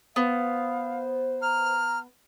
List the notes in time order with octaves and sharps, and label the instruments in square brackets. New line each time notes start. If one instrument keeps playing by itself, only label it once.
[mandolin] B3 [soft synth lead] C5 [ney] F5
[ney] A#5 [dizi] F6